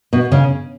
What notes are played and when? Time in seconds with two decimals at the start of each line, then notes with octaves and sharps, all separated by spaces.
0.13 B2
0.32 C#3